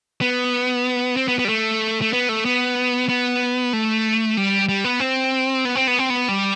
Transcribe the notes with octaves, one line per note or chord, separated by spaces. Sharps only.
B3
C4
B3
B3
G3
A3
A3
B3
A3
B3
B3
A3
G3
G3
B3
C4
B3
C4
B3
C4
B3
G3